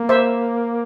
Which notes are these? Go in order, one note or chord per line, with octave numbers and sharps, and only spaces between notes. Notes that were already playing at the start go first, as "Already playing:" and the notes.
Already playing: A#3
C5 E5